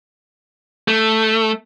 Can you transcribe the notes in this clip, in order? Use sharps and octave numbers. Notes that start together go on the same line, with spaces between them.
A3